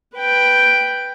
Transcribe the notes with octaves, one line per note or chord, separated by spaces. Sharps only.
B4 G5